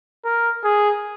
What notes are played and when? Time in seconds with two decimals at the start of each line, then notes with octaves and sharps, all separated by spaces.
0.25 A#4
0.64 G#4